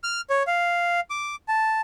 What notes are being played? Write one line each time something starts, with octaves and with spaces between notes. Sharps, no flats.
F6
C#5
F5
D6
A5